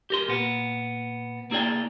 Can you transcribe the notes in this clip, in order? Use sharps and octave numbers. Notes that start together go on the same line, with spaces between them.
G4 A#4 C6
A#2 B3
A#3 E4 G#4 D5 G5